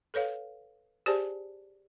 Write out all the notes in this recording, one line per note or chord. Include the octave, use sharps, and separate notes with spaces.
A4 B4 C#5 F5
G4 G#4 C5 D5 G#5 A5